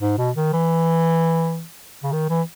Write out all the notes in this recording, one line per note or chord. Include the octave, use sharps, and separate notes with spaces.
G#2
B2
D#3
E3
C#3
D#3
E3